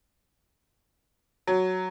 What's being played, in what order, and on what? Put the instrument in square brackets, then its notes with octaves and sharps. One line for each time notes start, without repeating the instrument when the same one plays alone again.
[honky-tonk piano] F#3